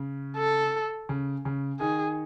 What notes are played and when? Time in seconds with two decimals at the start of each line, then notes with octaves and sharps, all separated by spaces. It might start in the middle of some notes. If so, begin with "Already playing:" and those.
Already playing: C#3
0.38 A4
1.09 C#3
1.45 C#3
1.81 D#3 G#4